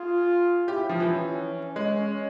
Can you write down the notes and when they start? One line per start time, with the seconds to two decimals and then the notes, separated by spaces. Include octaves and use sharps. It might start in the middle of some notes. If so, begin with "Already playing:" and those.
Already playing: F4 G#4
0.68 E4 G4
0.89 F3
1.00 E3
1.12 C#4
1.55 C#4
1.76 G#3
1.98 C#4